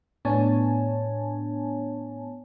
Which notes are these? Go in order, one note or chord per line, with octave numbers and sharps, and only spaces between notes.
A2 B3 D4 C#5 G#5 A5